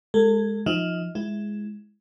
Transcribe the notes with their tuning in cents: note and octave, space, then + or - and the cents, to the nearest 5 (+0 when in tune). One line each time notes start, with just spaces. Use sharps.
G#3 -5 A4 +40
F3 +0 D#4 +0 D#5 +40
G#3 +0 E4 +0